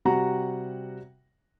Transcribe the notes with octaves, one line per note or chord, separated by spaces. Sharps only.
C3 G3 F#4 F#5 A#5